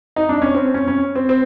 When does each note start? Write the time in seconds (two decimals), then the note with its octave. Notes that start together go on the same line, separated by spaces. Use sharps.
0.16 D#4
0.29 D4
0.42 C#4
0.54 C4
0.74 C#4
0.88 C#4
1.15 C4
1.29 C4